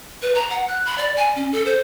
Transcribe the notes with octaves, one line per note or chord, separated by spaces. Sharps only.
B4
A#5
F#5
F#6
B5
D5
G#5
C#4
A4
C5